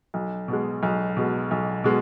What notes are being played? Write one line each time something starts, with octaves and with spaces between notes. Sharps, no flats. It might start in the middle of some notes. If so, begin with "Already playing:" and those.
B1
B2 G#3
B1
B2 G#3
B1
B2 G#3